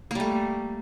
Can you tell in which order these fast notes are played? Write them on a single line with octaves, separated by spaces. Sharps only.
A#3 G3 A3